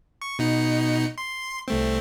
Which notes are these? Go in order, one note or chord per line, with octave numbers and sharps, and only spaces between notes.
C#6
B2 D#4 C#7
C6
C2 A3 C4